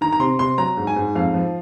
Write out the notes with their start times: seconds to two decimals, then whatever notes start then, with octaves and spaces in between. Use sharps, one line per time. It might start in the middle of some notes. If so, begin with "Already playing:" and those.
0.01 D#3 A#5
0.13 A#5
0.20 C3 C6
0.39 C3 C6
0.58 F#3 A#5
0.77 G#2
0.87 G#5
0.96 G#2
1.15 F2 F5
1.34 F3